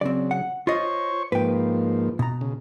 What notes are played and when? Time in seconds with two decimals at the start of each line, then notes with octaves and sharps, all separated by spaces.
0.01 C#3 F#3 C4 D5
0.31 F#5
0.67 F4 C5 C#5 D#5 C#6
1.32 G#2 F3 A#3 B4 G5
2.19 B2 A#5
2.41 C#3